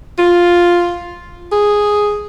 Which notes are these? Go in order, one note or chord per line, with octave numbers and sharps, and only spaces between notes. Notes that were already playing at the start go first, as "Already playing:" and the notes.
F4
G#4